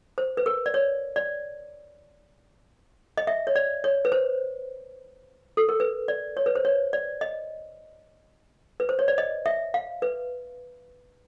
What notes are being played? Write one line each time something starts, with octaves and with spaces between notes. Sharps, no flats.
C5
B4
A#4
D5
C#5
D5
D#5
E5
C#5
D5
C#5
B4
C5
A4
A#4
B4
D5
C#5
B4
C5
C#5
D5
D#5
B4
C5
C#5
D5
D#5
E5
F5
B4